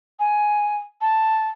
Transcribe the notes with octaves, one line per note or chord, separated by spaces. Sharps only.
G#5
A5